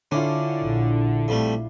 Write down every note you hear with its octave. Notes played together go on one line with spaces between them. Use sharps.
D3 C#4 D4 E4 F4
A#1
F2 G3 A3